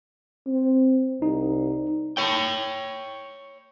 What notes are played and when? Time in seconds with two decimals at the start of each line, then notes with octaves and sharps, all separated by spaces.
0.47 C4
1.22 C2 D#4
2.17 C#5 G5